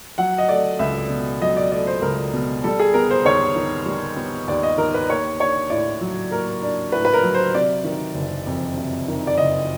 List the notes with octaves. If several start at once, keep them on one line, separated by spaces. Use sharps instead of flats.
F#3 F#5
D#5
A3 D5
C#2 E5
B2
F#3 D#5
D5
A3 D5
C5
C#2 A#4
B2
G3 A4
G#4
B3 A#4
C5
D#2 C#5
D#3
G3
B3
D#2 D5
D#5
D#3 A#4
B4
A#3 C#5
D4 C#5
A2 D5
F#3
A#3 A#4
D4
A2 B4
B4
A#4
F#3
C5
C3 D5
D#3
F#1
F2
C3
D#3
D5
F#1 D#5